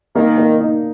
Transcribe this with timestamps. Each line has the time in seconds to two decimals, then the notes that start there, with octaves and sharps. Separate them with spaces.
0.15 D#3 A#3
0.38 A#3
0.61 D#4